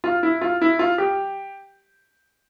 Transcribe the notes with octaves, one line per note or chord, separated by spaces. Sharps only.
F4
E4
F4
E4
F4
G4